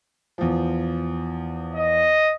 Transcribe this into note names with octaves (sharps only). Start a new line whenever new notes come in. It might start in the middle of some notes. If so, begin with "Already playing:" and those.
E2 F3
D#5